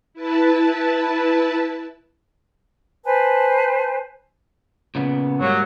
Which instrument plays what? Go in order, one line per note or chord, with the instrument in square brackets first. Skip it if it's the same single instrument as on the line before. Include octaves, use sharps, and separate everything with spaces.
[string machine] E4 B4 A5
[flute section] B4 C5 G#5 A5
[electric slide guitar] A#2 C#3 B3
[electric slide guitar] G#2 G3 A#3 [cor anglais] F#3